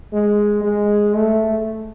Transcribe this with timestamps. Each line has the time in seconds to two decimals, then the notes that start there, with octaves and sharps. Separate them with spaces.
0.13 G#3
0.63 G#3
1.14 A3